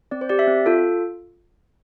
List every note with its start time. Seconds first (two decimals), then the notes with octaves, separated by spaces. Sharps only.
0.11 C4 D5
0.21 C5
0.29 G4 D5
0.39 E5
0.47 C4
0.66 F4 A4